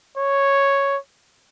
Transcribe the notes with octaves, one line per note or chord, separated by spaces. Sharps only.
C#5